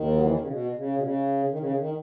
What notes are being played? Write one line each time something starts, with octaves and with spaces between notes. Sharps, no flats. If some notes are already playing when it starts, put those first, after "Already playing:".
Already playing: D#2 D#3
F#3
E3
D#3
C#3
B2
C#3
B2
C#3
D#3
C#3
D#3